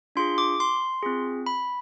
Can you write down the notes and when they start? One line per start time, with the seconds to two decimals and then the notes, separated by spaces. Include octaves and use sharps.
0.16 D4 F4 G#4 C6
0.38 D6
0.60 C6
1.03 C4 F4 G#4
1.46 B5